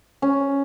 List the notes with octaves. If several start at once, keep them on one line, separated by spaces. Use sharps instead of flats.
C#4